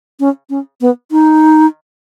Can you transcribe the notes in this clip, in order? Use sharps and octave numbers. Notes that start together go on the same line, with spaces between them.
C#4
C#4
B3
D#4